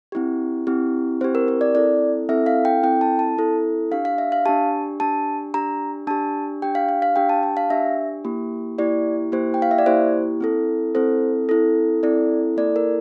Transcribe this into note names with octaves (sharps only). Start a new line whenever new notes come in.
C4 E4 G4
C4 E4 G4
C4 E4 G4 C5
A#4
A#4
D5
C4 E4 A4 D5
C4 E4 A4 E5
F5
G5
C4 E4 A4 G5
A5
A5
C4 E4 A4
D4 G4 F5
F5
E5
F5
D4 G4 A5
D4 G4 A5
D4 G4 A#5
D4 G4 A5
D4 G4 G5
F5
F5
F5
D4 G4 G5
A5
A5
F5
D4 G4 E5
A#3 E4 G4
A#3 E4 G4 D5
A#3 E4 G4 C5
G5
F5
E5
D5
A#3 E4 G4 C5
C4 E4 A4
C4 E4 A4 C5
C4 E4 A4
C4 E4 A4 D5
A#3 E4 A4 D5
A#4